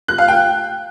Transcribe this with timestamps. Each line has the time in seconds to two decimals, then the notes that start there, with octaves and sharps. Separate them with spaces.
0.08 F#6
0.18 F5
0.28 G5